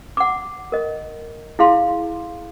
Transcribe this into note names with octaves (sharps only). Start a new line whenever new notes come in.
F#5 D6
A#4 D#5
E4 G#4 F5 C6